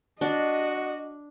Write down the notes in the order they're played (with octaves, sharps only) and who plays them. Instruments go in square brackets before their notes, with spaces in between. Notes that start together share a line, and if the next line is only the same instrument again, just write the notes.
[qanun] D4 [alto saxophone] F#4 [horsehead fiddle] D#5